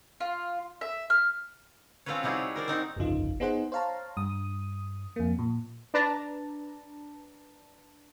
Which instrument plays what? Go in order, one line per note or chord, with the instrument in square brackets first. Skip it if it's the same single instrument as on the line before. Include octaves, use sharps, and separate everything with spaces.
[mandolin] F4
E5
F6
[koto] C4 C#4 F4 A4 B4 C#5
C3 G3 D#4 E4 F#4 G#4
C#5
A#4 C5 D5
C4 D#4 F#4 C5
[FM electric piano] G1 C2 F2 C#3 D#4 F4
B3 D#4 G#4 C5 F#5
C5 C#5 F5 A5 A#5
G2 D#6
F2 A#3
A#2
[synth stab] D4 B4 A5 A#5